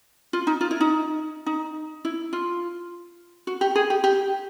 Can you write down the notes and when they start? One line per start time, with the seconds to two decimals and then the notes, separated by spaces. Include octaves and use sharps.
0.33 F4
0.47 D#4
0.61 F4
0.71 E4
0.81 D#4
1.46 D#4
2.05 E4
2.33 F4
3.47 F#4
3.61 G4
3.75 G#4
3.90 G4
4.04 G4